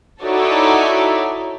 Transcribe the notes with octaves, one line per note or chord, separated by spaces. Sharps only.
D#4 E4 F#4 A4 C#5 D5